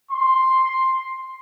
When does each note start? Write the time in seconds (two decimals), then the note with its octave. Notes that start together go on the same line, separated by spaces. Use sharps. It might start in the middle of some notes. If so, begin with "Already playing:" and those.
0.11 C6